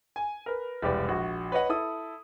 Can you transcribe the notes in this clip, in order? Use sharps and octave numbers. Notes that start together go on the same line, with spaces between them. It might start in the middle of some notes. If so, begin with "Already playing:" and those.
G#5
A#4 B4
E1 C2 G4 B4 D5
A#1 F#4
B4 C#5 D#5 F#5
E4 A4 D#6